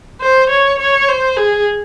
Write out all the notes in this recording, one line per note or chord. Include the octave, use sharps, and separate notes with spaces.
C5
C#5
C#5
C5
G#4